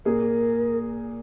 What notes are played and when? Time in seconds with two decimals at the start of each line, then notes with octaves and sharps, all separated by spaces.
0.05 A#2 A#3 G#4 A#4